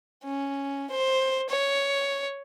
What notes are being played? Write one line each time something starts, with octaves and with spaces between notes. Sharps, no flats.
C#4
C5
C#5